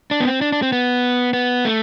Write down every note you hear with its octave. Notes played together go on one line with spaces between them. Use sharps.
D4
B3
C4
D4
D4
C4
B3
B3
A3